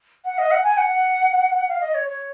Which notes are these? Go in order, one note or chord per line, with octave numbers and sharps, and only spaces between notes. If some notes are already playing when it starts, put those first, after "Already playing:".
F#5
D#5
F#5
G#5
F#5
F5
D#5
C#5
C#5